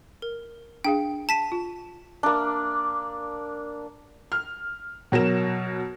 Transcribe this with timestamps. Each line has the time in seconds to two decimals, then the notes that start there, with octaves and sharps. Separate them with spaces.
0.22 A#4
0.85 D4 G#4 F5 G5
1.29 A5 B6 D#7
1.52 F4
2.23 A#3 D4
4.32 F6
5.12 B2 F#3 A#4 E7